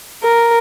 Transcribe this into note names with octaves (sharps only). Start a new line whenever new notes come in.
A#4